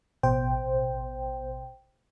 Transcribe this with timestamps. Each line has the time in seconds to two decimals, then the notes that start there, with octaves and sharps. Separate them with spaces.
0.23 A1 B2 C5 G5